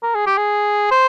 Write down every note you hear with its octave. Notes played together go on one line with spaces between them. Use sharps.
A#4
G#4
G4
G#4
C5